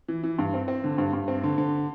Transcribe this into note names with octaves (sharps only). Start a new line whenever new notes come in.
E3
E3
G2
C4
C4
D3
G2
G2
C4
D3
D3